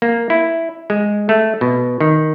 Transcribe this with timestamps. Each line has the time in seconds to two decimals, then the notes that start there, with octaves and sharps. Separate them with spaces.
0.02 A#3
0.30 E4
0.90 G#3
1.29 A3
1.61 B2
2.00 D#3